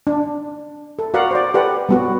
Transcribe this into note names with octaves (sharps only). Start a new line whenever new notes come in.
D4
A4
F#4 A#4 D5 F5 F#5
C5 D5
G4 A4 B4 D5 F#5
G3 B3 F#4